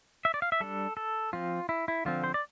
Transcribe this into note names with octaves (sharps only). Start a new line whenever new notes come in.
E5
D5
F5
E5
G3 D4 A4
A4
F3 C4 F4
E4
E4
D3 F3 C4 F4
C5
D5